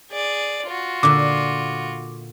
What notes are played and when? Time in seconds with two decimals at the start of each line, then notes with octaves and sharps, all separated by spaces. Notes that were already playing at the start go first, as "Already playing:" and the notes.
0.11 G#4 D5
0.67 F4 F#4
1.03 A#2 D3 D6